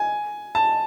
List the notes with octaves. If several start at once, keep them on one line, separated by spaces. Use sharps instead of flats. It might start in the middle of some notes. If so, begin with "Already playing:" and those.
Already playing: G#5
A5